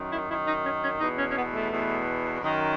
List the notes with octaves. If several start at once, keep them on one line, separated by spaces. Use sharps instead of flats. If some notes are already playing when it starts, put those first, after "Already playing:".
Already playing: F#2 D#3
E4
F#2 D#3 E4
D#4
C#4
C#4
E2 B2 D#4
C#4
C#4
B3
A3
E2 B2
F#2 D#3